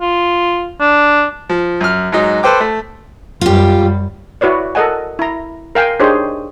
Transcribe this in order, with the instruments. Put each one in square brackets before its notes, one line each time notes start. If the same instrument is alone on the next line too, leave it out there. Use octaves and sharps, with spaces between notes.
[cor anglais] F4
D4
[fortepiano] F3
F#2 F6
G#2 F#3 D#4
A4 B4 C5 G5 D6
A3
[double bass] F#2 G3 [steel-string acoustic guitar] F4 G4
[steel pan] E4 F#4 B4 C#5 D5
A4 A#4 D#5 F#5 G#5
E4 A#5
A#4 F5 G5 G#5
D4 D#4 G4 G#4 C5 C#5